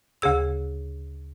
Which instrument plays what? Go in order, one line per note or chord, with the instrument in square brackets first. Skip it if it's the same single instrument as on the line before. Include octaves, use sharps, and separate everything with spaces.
[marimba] D2 C#3 G#4 E6